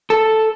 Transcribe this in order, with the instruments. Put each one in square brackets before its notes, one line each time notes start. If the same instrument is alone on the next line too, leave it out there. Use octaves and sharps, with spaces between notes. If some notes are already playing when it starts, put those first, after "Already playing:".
[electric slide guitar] A4